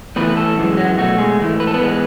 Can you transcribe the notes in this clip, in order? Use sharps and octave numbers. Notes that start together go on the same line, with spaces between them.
A2 E3 A3 B3 B4
A3 A4
F#2 E3 G#3
F#3 F#4
B2 F#3 A3 F#4
G#3 G#4
G#2 E3 A3
B4
A4
B3 B4
G#2 E3 G#3